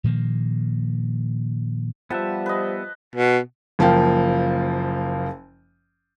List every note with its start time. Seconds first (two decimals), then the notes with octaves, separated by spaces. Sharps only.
0.04 A#2 D#3 F3 A#3
2.10 F3 G3 B3 G4 E5 F#5 A5
2.46 B4 D#5
3.15 B2
3.79 F#1 F3 A#3 F5 G5